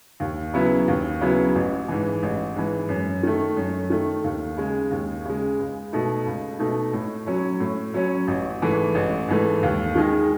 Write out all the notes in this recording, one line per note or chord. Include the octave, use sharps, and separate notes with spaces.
D#2
C#3 F#3 B3 E4
D#2
C#3 F#3 B3 E4
A1
G#2 E3
A1
G#2 E3
F#2
D#3 A3
F#2
D#3 A3
D#2
C#3 G#3
D#2
C#3 G#3
C#2
B2 A3 D#4
C#2
B2 A3 D#4
A2
F#3 C#4
A2
F#3 C#4
A1
G#2 E3 A3
A1
G#2 E3 A3
D#2
D#3 G#3 D#4 G#4